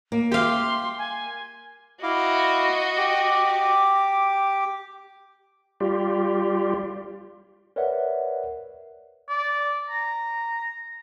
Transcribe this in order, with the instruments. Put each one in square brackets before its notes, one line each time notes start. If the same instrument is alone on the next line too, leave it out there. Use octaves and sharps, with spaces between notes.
[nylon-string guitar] A#3
[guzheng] G4 F5 [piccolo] C6
[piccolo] G#5
[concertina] E4 F5 D6 [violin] F#4 D#5
[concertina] G4 D6
[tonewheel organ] G3 F4 G4
[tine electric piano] A#4 B4 C#5 D5 E5 F#5
[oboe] D5
A#5